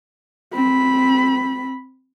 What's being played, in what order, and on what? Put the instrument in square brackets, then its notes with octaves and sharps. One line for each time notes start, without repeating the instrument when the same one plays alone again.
[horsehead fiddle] C4 B5